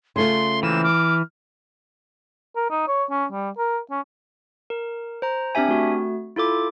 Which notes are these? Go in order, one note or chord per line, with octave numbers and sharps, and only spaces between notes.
C#3 A3 F4 C6
E3 G#3 A#3 C4 E7
D6 F6
A#4
D#4
C#5
C#4
G3
A#4
C#4
A#4
C5 A#5
C4 D4 G4 E5 G#5
A3 F#4
E4 F4 A4 D6